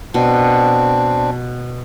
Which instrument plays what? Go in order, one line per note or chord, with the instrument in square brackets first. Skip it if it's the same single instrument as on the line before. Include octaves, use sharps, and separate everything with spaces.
[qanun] B2 [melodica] C4 D4